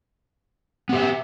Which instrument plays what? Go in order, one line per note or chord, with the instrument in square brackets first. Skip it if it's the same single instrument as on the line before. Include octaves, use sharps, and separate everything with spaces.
[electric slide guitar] B3
G4
E5